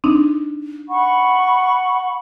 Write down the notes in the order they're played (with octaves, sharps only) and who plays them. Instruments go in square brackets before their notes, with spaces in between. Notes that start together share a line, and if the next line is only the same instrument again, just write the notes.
[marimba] C4 D4 D#4
[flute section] F#5 B5 C#6